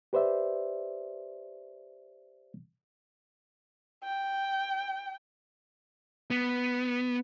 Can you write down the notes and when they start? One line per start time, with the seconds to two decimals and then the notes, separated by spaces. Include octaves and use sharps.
0.13 G4 B4 C5 D5 E5
4.04 G5
6.31 B3